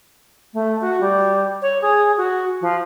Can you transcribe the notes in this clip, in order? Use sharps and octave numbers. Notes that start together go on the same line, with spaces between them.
A3
F#4
G3
C#5
G#4
F#4
F3